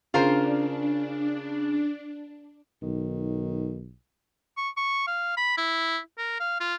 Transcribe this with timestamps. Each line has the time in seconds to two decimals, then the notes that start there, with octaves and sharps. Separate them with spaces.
0.14 C#3 D4 F4 A#4 C5
2.82 B1 D#3
4.57 C#6
4.77 C#6
5.07 F5
5.37 B5
5.57 E4
6.18 A#4
6.40 F5
6.60 F4